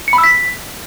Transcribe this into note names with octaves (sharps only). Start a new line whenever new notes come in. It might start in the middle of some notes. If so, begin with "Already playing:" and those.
C#7
B5
E6
B6